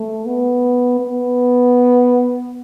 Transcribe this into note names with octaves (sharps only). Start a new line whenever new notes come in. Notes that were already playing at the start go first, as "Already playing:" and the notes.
Already playing: A3
B3
B3